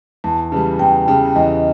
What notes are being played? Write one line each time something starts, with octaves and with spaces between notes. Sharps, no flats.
E2 A5
C#3 E3 G3
E2 G5
C#3 E3 G3
E2 D#5